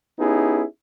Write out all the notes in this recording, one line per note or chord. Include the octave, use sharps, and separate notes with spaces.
B3 C#4 D#4 E4 G4 G#4